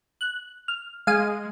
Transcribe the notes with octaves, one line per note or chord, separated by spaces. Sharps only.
F#6
F6
G#3 F5 G#5 D#6